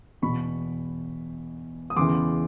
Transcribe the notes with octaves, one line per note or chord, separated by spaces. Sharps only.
E2 B2 B5 C#6
D#6
E2 C#3 E3 C6 D6